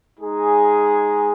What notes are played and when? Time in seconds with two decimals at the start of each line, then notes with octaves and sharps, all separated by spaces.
0.19 G#3 D#4 G#4